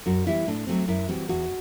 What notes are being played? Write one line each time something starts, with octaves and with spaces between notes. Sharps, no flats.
F#2 F#4
E3 G3 B3 E4
A2 D4
F#3 A3 C4
F#2 E4
E3 G3 C4 F#4
E2 F#4